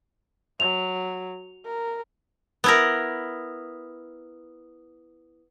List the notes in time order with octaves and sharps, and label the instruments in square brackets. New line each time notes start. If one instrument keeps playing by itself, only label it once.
[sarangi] F#3 [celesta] F7
[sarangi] A#4
[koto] B3 E4 A#4